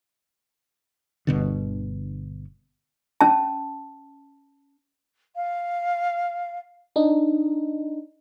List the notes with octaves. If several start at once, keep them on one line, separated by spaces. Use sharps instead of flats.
G1 B2 D3
C#4 A5
F5
D4 D#4